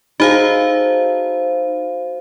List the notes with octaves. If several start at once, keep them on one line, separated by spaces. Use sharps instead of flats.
D#4 F#4 G#4 A4 C5 F5